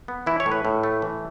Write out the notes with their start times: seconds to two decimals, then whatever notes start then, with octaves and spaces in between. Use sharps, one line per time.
0.08 B3
0.26 E3 E4
0.40 C#5
0.46 A2
0.52 B4
0.65 A2
0.83 A3
1.02 E3